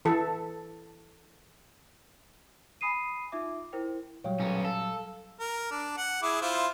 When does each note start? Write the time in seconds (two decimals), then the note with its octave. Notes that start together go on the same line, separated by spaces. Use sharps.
0.05 E3 A4
2.81 G#5 B5 D#6 C7 D#7
3.32 D#4 F4 E5 D6
3.73 E4 A#4 C5 G5
4.24 A#2 F#3 G3 C#5 F5 G5
4.40 B1 C#4
4.65 A4 F5
5.40 A#4
5.71 D4
5.97 F#5
6.22 E4 G#4 D6
6.41 E4 F4 C5